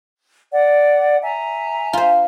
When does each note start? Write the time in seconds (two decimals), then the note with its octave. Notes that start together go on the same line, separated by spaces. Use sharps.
0.51 D5 F#5
1.22 E5 G#5 A#5
1.93 F4 C5